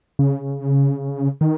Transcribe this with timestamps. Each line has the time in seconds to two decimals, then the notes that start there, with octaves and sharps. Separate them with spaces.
0.19 C#3
1.41 D#3